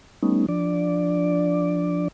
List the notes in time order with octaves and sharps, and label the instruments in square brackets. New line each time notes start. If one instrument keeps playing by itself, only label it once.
[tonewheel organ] G3 A3 B3 C#4 D#4
F3 D4 D5